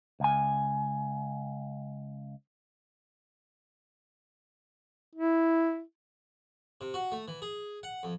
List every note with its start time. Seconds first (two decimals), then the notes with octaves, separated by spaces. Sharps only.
0.20 C#2 G#5
5.15 E4
6.81 C3
6.94 F#4
7.12 A3
7.28 E3
7.42 G#4
7.83 F#5
8.03 F2